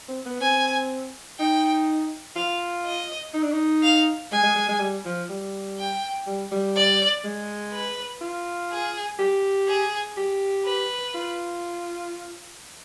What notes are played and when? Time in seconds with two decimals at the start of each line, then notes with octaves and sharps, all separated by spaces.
0.08 C4
0.25 B3
0.41 C4 G#5
1.39 D#4 G5
2.36 F4 F5
2.85 D#5
3.33 D#4
3.43 D4
3.52 D#4
3.83 F5
4.32 G#3 G#5
4.44 G#3
4.55 G#3
4.69 G#3
4.80 G3
5.05 F3
5.29 G3
5.78 G5
6.27 G3
6.51 G3
6.75 D5
7.24 G#3
7.72 B4
8.21 F4
8.71 G#4
9.19 G4
9.68 G#4
10.17 G4
10.65 B4
11.15 F4